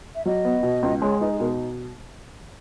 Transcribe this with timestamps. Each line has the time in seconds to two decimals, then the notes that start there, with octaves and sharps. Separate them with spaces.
0.15 E5
0.26 F#3 D#5
0.45 B3
0.63 B2
0.83 C#2
1.02 G#3 C#5
1.21 D#4 B4
1.31 G#4
1.40 B2 A#4